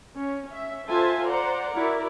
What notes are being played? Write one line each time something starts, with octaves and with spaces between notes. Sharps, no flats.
C#4
C#4 E5
F4 A4 C5 E5 G#5 A5
C5 D5 F#5 A#5
E4 F#4 A#4 D5